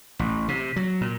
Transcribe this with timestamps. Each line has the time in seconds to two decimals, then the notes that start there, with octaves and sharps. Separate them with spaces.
0.19 A1
0.48 C3
0.76 F#3
1.01 A#2